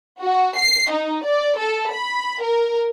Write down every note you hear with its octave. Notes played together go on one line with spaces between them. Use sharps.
F#4
C7
D#4
D5
A4
B5
A#4